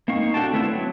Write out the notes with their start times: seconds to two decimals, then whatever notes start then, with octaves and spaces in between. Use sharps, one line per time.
0.08 A#3 C4 D#4 F5 C#6
0.34 D4 F#4 A4 G5 A5
0.53 A3 B3 C4 E4
0.68 F#3